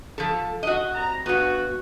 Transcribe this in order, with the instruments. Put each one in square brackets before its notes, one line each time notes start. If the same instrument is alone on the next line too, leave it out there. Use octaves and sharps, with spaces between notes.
[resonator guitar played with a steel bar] F3 A4
F#4 D#5
[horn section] G3 C4 A#5
[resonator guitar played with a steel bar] G2 B3 [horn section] F#4